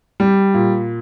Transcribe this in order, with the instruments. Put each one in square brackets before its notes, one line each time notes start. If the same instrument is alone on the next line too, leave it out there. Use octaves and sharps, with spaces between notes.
[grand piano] G3
A#2